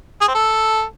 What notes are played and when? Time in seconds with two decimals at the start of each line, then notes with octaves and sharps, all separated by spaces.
0.22 G#4
0.28 C4
0.35 A4